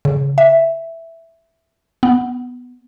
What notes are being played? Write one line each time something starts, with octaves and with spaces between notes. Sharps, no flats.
C#3
E5
B3